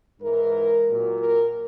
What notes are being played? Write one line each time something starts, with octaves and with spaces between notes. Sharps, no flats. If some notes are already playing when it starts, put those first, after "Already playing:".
G#2 E3 A#4
A#2 F#3
A#4